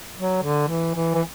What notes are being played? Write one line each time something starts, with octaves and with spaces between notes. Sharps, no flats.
F#3
D3
E3
E3
E3